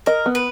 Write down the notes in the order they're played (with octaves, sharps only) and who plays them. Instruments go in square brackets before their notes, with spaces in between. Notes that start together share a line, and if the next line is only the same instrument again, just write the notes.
[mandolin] A#4 [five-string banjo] D#5
[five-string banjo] B3
[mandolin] B4